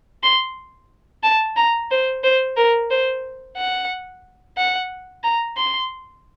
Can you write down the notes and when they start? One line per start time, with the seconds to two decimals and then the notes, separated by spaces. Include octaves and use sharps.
0.23 C6
1.24 A5
1.56 A#5
1.91 C5
2.24 C5
2.56 A#4
2.91 C5
3.57 F#5
4.57 F#5
5.24 A#5
5.57 C6